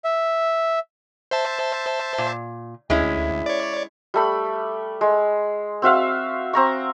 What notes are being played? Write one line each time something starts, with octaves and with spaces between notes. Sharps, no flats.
E5
C5 E5 A5
A#2
D2 G#3 C#4 E4
C#5 D5
G3 A3 B5
G#3
C4 F#4 E5 F5
C4 A#5 C#6